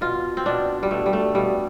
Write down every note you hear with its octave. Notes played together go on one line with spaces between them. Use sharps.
B2 F4
C4
B2 D4
G3
B2 A3
G3
A3
B2 G3